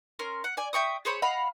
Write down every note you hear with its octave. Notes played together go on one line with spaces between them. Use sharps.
C#4 A#4 C6
F#5
D5 G#5
E5 G5 C#6 D#6
G#4 C5 C#5 B5
D#5 F5 F#5 B5